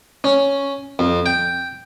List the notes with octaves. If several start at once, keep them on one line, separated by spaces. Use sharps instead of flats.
C#4
F2
G5